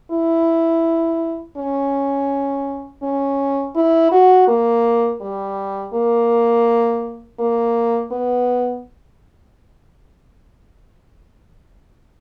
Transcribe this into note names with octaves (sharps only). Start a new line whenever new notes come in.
E4
C#4
C#4
E4
F#4
A#3
G3
A#3
A#3
B3